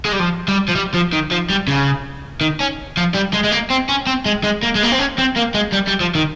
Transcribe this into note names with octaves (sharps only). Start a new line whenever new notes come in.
G#3
G3
F3
G3
F3
G3
F3
D#3
F3
G3
C#3
D#3
C#4
F3
G3
G#3
G#3
A#3
C4
C#4
C4
G#3
G#3
A#3
G#3
A#3
C4
C#4
C4
A#3
G#3
G3
G3
F3
D#3